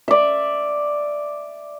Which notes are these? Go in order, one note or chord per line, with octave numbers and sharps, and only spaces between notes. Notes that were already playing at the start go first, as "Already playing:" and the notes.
D5 E5